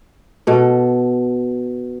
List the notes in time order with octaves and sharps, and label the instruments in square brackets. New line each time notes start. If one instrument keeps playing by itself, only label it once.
[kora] B2 A4